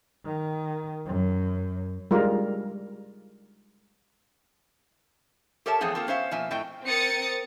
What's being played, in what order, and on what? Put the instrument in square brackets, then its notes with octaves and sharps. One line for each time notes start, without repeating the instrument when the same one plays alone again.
[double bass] D#3
F#2
[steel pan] G3 G#3 F4 A#4
[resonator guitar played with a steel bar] G4 A4 A#4 C#5 E5 A5
E2 F3 A3 C4 G#4 F#5
A#3 C4 F4 A4
B3 C#4 C5 E5 F5
B2 F3 A#3 E5 G#5
A2 A3 C4 D#5 G5
[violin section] C4 A#4 D#6 A6 C#7